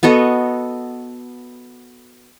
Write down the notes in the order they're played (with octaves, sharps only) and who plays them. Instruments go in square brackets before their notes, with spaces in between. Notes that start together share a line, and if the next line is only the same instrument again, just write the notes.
[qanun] B3 F#4 A4 D#5